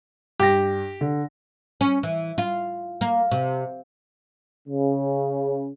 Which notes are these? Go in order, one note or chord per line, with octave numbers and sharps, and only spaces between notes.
G2 G4 A#6
D3
C#4
E3
F4
A#3
C3
C#3